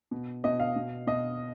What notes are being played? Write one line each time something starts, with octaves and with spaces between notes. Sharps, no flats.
B2
B2 D#5
F5
B2
B2 D#5